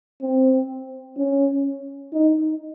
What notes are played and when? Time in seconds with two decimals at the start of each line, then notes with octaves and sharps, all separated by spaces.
0.22 C4
1.17 C#4
2.13 D#4